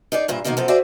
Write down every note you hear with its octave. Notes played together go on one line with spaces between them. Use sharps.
D#4 G#4 D5
G2 A#2 E4
F#2 B2 D#3 A#3 D4 D#4
F#2 F3 A4
F#4 G#4 C5 D5 E5 G#5